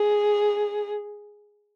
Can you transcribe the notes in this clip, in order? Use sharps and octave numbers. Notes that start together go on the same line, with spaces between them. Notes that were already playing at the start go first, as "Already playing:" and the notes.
Already playing: G#4